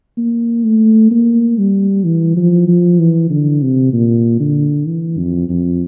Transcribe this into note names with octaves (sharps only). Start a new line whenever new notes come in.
A#3
A3
A#3
G3
E3
F3
F3
E3
D3
C3
A#2
D3
E3
F2
F2